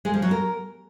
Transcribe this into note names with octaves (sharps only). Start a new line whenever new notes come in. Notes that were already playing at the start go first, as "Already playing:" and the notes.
G#3
F3
F#3
A#4